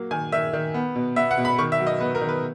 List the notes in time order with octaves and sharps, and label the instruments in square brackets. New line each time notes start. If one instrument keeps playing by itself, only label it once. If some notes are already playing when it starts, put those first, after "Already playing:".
Already playing: [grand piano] F#3 A#3
D#3 G#5
D#3 E5
D#3
B3
B2
B3 E5
F#5
B2
B5
D#3 C#6
E5
F#3
D#5
B3 B4
A#4
D#3
B4